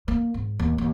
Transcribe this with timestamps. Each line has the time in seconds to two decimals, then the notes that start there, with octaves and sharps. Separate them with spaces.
0.08 A#3
0.34 G#2
0.59 D#2
0.78 D#2